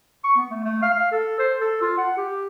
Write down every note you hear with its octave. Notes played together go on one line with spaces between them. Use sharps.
C#6
B3
A3
A3
F5
F5
A4
C5
A4
F4
F#5
G4